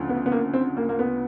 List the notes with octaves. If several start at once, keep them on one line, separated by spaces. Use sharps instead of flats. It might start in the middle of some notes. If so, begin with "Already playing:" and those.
Already playing: D2 C#3 F3
B3
B3
A#3
C4
A#3
A#3
B3